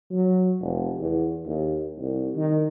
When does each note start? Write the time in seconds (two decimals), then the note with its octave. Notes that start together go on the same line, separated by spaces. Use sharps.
0.11 F#3
0.61 F1
0.99 E2
1.46 D#2
1.98 C2
2.35 D#3